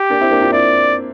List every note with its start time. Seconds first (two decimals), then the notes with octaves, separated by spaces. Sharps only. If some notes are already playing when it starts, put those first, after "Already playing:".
Already playing: G4
0.10 A#3 D4
0.21 C4 E4
0.31 A#3 D4
0.42 D4 F4
0.52 C4 E4 D5